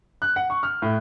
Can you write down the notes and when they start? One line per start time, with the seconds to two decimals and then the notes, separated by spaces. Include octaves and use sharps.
0.22 F#6
0.36 F#5
0.50 C#6
0.63 F6
0.82 A2